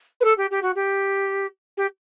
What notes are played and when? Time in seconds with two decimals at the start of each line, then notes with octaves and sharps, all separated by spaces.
0.20 B4
0.24 A4
0.37 G4
0.50 G4
0.62 F#4
0.75 G4
1.77 G4